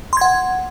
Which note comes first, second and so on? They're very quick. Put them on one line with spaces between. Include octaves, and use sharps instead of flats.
C6 G#6 F#5